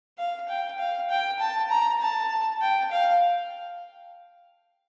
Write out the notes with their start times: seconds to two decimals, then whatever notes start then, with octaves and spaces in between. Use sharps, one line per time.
0.18 F5
0.49 G5
0.78 F5
1.09 G5
1.39 A5
1.69 A#5
2.01 A5
2.61 G5
2.91 F5